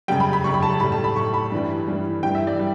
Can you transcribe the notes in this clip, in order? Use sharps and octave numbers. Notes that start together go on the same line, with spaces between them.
F#2 C#3 G3 G5
B5
B5
F#2 C#3 G3 C#6
B5
A5
A2 G3 B5
A5
B5
A2 G3 C#6
B5
G2 E3 G3
G2 E3 G3
G2 E3 G3 G5
E5
D5
G3